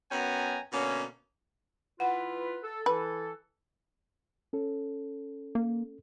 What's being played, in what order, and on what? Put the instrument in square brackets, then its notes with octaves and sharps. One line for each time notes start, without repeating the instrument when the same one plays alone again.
[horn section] F#2 B3 C#4 G5 G#5 A#5
B2 D3 A#3 C#4
[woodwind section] E3 F4 B4 [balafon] F#5
[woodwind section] A4
[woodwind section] E3 A4 [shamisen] B4
[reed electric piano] C#4 A4
[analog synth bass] A#3